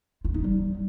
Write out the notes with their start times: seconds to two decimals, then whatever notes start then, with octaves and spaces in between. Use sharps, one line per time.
0.25 F4
0.34 D#4
0.44 G3